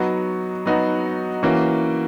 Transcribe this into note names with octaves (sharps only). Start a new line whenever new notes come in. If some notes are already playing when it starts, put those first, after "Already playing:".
Already playing: F#3 B3 D#4 F#4
F#3 B3 D#4 F#4
E3 A#3 C#4 F#4